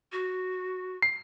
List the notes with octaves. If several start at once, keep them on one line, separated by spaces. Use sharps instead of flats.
F#4
C7